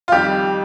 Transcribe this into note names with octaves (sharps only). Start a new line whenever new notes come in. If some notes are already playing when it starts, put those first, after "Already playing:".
F4
F2 D#3 G3 G4